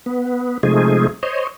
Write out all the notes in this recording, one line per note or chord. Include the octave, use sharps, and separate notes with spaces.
B3
C3 F3 G#3 A3 D#4 G#4
C5 C#5 D#5